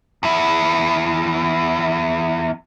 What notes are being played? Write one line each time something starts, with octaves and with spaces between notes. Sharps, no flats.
E2 E4